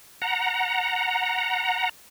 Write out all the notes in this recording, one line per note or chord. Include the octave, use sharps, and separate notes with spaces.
F#5 A#5